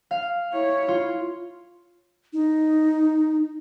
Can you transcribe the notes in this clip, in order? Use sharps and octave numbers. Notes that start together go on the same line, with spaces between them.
F5
E4 C#5
F4
D#4